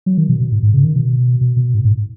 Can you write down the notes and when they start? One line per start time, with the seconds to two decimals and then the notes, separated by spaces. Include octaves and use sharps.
0.06 F#3
0.18 D#3
0.29 B2
0.40 B2
0.52 G#2
0.63 G#2
0.74 C#3
0.84 D#3
0.96 B2
1.41 B2
1.57 B2
1.74 G#2
1.84 G#2